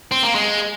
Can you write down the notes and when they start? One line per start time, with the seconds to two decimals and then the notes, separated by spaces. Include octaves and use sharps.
0.11 C4
0.23 A#3
0.35 G#3